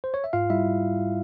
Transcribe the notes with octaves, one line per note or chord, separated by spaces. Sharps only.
C5
C#5
E5
G#2 F4 F5
G3 E4 E5